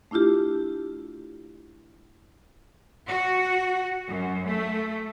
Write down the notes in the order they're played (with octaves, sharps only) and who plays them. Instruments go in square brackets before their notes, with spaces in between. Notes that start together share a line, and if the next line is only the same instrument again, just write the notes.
[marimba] A3 D4 E4 F4 G4
[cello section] F#4
F#2
A3